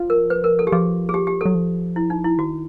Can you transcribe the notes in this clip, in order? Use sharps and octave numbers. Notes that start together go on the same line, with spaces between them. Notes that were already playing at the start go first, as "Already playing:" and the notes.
Already playing: F3
A#4
B4
A#4
A4
G4
F3 G#4
G#4
G4
G4
F#3 A4
F3
E4
D#4
E4
D#3 F#4